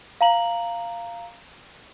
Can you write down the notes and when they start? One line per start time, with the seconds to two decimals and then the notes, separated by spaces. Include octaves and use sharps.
0.21 F5 A#5 F#7